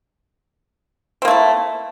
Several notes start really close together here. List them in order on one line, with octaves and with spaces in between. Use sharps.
C4 A#3 A3 E4